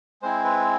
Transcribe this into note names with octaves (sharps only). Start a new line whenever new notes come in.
G#3 C4 E4 C5
B4